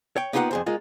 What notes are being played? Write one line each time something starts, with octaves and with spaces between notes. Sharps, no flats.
C#5 G5
A#3 B3 D#4 F4 G4 F#5
F2 G#4 C5
G#3 A#3 F4